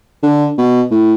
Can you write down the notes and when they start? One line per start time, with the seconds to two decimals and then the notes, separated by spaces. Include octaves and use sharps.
0.23 D3
0.58 B2
0.91 A2